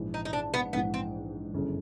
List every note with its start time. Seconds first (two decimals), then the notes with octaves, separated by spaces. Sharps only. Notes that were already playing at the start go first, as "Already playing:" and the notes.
Already playing: A#1 G#2 E3
0.14 D#4
0.25 D#4
0.33 D4
0.54 B3
0.73 A#1 G#2 E3 B3
0.94 C4
1.53 G1 F#2 C#3 E3